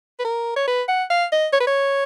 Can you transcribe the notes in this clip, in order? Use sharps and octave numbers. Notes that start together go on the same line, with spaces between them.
B4
A#4
C#5
B4
F#5
F5
D#5
C#5
B4
C#5